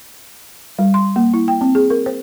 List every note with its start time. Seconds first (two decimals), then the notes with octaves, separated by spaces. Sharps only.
0.79 G3
0.94 C6
1.16 A#3
1.34 E4
1.48 G5
1.61 C4
1.75 G#4
1.90 A#4
2.06 C5